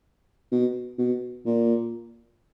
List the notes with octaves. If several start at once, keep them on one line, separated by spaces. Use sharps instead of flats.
B2
B2
A#2